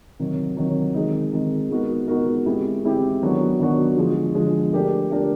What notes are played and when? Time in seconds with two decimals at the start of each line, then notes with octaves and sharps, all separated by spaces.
0.19 C3 D#3 F#3
0.57 C3 D#3 F#3
0.94 D#3 G#3 C4 D#4
1.33 D#3 G#3 C4 D#4
1.70 G#3 B3 D#4 F#4 A#4
2.08 G#3 B3 D#4 F#4 A#4
2.46 G#3 C4 E4 G4
2.84 G#3 C4 E4 G4
3.22 D#3 F#3 B3 D4 F#4
3.59 D#3 F#3 B3 D4 F#4
3.97 D3 F3 G#3
4.35 D3 F3 G#3
4.72 A3 D4 G4 A#4
5.10 A3 D4 G4 A#4